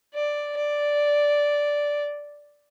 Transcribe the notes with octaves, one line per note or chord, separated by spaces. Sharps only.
D5
D5